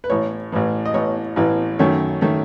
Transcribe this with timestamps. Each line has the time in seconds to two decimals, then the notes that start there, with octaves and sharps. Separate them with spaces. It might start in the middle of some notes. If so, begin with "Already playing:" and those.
0.04 B4
0.10 A1 A2 E3 C#5
0.52 A1 A2 E3
0.85 D#5
0.94 A1 A2 E3 C#5
1.36 A1 A2 E3
1.79 F#2 D#3 A3 C#4 C#5
2.21 D#3 A3 C#4